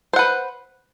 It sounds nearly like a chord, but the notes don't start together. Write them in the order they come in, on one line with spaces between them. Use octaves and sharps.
C5 F#5 B4